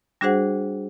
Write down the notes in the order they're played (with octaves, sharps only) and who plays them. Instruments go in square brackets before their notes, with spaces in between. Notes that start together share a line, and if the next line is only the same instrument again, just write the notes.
[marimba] G3 D4 F#4 G#4 C5 F#5